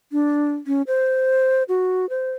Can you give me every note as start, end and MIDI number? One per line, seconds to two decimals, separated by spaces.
0.12 0.53 62
0.67 0.82 61
0.87 1.63 72
1.69 2.09 66
2.09 2.32 72